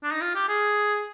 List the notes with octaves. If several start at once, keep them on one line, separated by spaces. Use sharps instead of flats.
D4
D#4
F4
G4
G#4